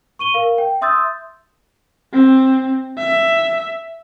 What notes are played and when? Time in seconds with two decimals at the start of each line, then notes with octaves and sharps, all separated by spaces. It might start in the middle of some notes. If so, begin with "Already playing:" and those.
0.19 C#6 D#7 G7
0.34 A#4 F5
0.58 G5
0.81 E5 C6 D#6 E6 G6 A6
2.13 C4
2.98 E5